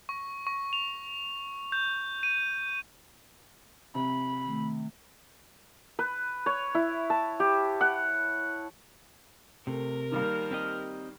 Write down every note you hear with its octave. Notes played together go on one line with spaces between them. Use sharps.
C#6
C#6
F7
G6
D#7
C3 B5
D#3 A3
B4
C#5
E4
A5
G4
F#5
C3 A3 A#4
D#3 F3 G3 A#3 F6
C4 G4 D#5